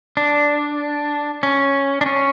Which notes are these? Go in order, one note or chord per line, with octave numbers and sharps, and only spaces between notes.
D4
C#4
D4
C#4